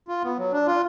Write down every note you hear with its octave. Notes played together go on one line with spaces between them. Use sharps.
F4
B3
F#3
D4
F4